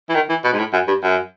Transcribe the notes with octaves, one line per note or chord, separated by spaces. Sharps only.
E3
D#3
E3
B2
G#2
A2
F#2
G2
F#2